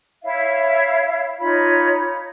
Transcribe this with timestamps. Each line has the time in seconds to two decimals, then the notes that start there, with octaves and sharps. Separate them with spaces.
0.24 E4 C#5 E5 F5
1.39 D#4 F4 C#5 B5